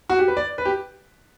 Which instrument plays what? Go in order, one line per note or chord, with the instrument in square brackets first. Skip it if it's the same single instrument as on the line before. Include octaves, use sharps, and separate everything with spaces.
[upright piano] F#4
G4
B4
D5
B4
G4